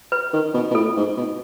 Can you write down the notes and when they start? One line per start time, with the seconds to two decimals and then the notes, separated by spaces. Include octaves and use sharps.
0.12 B4
0.33 D#3
0.54 B2
0.71 B2
0.75 A2 A4
0.97 G#2
1.17 B2